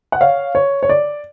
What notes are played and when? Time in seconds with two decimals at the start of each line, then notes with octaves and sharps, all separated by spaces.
0.12 F#5
0.21 C#5 F5
0.55 C#5
0.83 C#5
0.89 D5